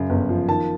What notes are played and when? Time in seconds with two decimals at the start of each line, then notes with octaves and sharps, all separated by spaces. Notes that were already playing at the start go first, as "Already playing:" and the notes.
Already playing: F#2 C#3
0.10 G1
0.29 F3
0.48 D#3 A5